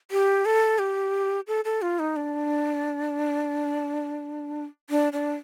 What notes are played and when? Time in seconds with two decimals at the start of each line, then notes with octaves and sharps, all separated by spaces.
0.11 G4
0.45 A4
0.79 G4
1.47 A4
1.65 A4
1.82 F4
1.99 D#4
2.16 D4
4.90 D4
5.13 D4